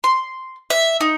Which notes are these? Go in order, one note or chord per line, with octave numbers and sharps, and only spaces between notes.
C6
E5
D#4